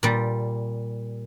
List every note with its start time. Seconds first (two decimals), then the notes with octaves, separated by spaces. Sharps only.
0.03 A#2 G3